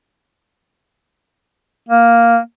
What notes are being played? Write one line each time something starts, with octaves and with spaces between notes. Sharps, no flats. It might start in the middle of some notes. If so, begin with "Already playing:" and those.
A#3